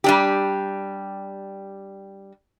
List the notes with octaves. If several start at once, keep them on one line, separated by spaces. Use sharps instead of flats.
G3 D4 G4